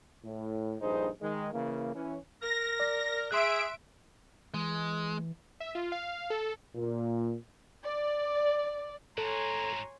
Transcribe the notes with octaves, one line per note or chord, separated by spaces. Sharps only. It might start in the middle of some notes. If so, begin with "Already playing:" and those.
A2
A#1 G2 D#4 G#4 C5
D#3 G#3
C#3 E3 A#3
E3 C#4
A#4 A#6
D5
G#4 E5 C6 F#6 D7
E3 G#3
E5
F4
F5
A4
A#2
D5
G#2 F#4 A4 C#5 G#5 A#5 C6